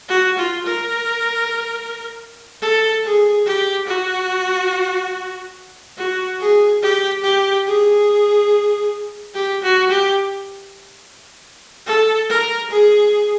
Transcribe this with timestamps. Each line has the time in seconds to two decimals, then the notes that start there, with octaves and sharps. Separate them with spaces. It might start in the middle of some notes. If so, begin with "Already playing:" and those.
0.08 F#4
0.38 F4
0.66 A#4
2.62 A4
3.04 G#4
3.46 G4
3.87 F#4
5.97 F#4
6.40 G#4
6.82 G4
7.23 G4
7.67 G#4
9.34 G4
9.63 F#4
9.90 G4
11.86 A4
12.29 A#4
12.70 G#4